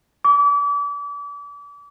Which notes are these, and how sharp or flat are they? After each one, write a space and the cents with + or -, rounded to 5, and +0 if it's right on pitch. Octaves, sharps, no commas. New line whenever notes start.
D6 -35